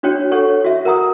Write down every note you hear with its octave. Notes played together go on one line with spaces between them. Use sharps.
D4 F#4 C#5 G5
G4 A4 C#5 F#5
F#4 E5
A#4 F#5 A#5 D#6